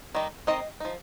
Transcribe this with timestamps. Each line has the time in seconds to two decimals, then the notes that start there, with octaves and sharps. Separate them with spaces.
0.15 D#3 G3 D#4
0.47 D#3 C4 D#4 D#5
0.80 F3 D#4